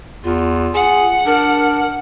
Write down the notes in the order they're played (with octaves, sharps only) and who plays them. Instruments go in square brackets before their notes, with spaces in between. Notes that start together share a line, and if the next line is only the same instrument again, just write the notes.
[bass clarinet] E2 [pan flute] F4
[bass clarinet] G#4 [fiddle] F#5
[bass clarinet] D4 [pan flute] A#4